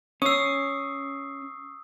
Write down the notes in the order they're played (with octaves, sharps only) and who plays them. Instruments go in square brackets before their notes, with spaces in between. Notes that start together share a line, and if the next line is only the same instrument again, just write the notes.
[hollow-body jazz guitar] C#4 [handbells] C#6 C7 [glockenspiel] D#6 E6